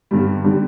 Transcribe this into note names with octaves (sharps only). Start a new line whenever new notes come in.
G2 D3 G3 B3
D3 G3